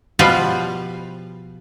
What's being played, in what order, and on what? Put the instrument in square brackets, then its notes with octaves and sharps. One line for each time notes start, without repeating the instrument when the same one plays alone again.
[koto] B2 F3 G3 B4 F5